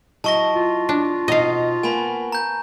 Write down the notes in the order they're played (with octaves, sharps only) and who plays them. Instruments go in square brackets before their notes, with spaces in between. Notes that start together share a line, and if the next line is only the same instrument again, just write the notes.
[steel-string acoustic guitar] F#3 E4 D#5 [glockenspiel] A5 C#6 A#6
[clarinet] F4
[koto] D4
[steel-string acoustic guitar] B2 C4 D#4 [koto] D#5 F5
[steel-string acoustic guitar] A#3 B3 [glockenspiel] G#5 B5
[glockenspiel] A#5 G6